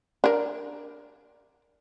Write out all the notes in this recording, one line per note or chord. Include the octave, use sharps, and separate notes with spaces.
D4 A#4